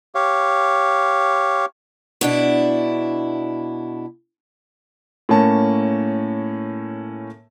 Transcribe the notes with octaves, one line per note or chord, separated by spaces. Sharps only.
G4 C#5 F5
B2 D4 E4
A2 A#3 C#4 A5